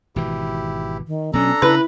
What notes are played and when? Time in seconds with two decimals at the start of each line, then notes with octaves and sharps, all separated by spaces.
0.16 G#1 B2 E3 E4 G4
1.07 D#3
1.33 B2 F#3 B3 C#4 D4 A4 A#5
1.62 C#3 E4 B4